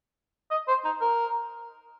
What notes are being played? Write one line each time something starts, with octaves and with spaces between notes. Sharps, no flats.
D#5
C5
D#4
A#4